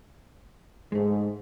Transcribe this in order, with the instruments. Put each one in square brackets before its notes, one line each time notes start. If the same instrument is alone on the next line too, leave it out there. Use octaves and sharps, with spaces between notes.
[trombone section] G#2 [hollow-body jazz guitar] G#3 A3